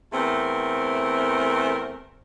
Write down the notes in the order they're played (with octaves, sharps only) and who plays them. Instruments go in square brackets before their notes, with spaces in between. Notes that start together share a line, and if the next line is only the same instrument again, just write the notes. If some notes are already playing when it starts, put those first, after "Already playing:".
[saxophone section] E2 A3 C4 A#4